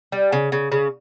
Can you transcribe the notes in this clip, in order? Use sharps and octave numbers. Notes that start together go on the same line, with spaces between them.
G3
C#3
C#3
C#3